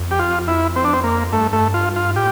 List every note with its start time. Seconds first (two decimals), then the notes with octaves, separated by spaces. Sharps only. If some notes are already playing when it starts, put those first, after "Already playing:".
Already playing: F2
0.11 G4
0.19 F4
0.48 E4
0.76 C4
0.84 D4
0.93 C4
1.04 A#3
1.32 G2 A3
1.53 A3
1.74 F4
1.96 F4
2.16 A2 G4